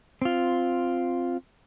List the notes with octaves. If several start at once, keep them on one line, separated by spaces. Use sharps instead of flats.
C4 F4